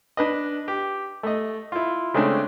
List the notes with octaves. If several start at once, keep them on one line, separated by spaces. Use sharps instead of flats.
D4 B4 D#5
G4
A3 D#5
E4 F4
C#3 G#3 A3 C4 D4